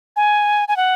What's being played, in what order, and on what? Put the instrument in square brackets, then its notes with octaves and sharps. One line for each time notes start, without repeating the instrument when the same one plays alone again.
[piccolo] G#5
G#5
F#5